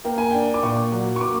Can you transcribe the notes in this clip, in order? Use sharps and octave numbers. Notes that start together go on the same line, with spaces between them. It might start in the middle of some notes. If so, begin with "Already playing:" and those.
A#3 G5
G#5
D4 G5
D6
A#2 C#6
F#3
C#6
A#3 D6